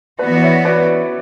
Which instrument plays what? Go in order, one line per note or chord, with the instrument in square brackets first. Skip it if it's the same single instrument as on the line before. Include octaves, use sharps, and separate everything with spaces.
[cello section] E3 B3 F#4 [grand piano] B4 D5
[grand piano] D5
C#5 E5
B4 D5